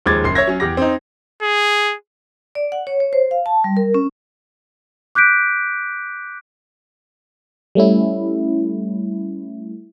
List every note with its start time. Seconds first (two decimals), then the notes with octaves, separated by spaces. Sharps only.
0.06 D#2 F3 G#3 D6 G#6 A6
0.24 F#1 C6 C7
0.35 C#5 E5 G#6 A#6
0.48 F#3 C#4
0.60 E2 G4 D6 A#6
0.77 C4 D#4
1.43 G#4
2.55 D5
2.72 F#5
2.87 C#5
3.00 C#5
3.13 C5
3.31 F5
3.46 A5
3.64 G3
3.77 A#4
3.94 C#4
5.15 D6 F#6 G6 B6 D7
7.75 G3 A3 C#4 E4